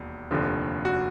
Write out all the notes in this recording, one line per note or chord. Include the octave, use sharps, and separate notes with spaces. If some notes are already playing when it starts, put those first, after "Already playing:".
Already playing: E1 D#2
F1 D#2 D3 F3
F#4